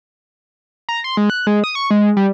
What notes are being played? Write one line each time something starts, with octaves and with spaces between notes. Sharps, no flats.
A#5
C6
G#3
F#6
G#3
D#6
C#6
G#3
G3